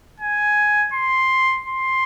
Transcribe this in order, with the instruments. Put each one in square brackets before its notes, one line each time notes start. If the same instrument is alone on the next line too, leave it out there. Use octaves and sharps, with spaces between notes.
[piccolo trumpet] G#5
C6
C6